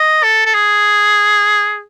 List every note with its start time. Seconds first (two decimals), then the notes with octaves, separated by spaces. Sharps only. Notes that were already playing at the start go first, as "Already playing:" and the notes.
Already playing: D#5
0.23 A4
0.45 A4
0.54 G#4